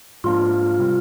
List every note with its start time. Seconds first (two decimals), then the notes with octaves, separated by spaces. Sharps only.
0.24 G#2 F3 A#3 D4 F4
0.80 C3 G3